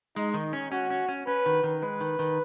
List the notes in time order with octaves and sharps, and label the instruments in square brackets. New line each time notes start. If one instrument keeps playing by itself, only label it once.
[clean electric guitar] G#3 [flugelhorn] D#4
[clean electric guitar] D#3
C#4
[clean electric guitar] C#4 [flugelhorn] F#4
[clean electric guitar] C#4
C#4
[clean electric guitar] C#4 [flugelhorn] B4
[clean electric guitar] D#3
D#3
[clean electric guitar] G#3 [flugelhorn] B4
[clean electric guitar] D#3
D#3